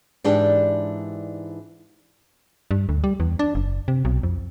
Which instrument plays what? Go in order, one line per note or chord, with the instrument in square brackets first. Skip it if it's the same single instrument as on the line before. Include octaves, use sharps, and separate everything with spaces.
[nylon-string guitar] G#2 E3 D4 G4 G5 A5
[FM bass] G2
D2
G3
E2
D4
F#1
C3
B1
F2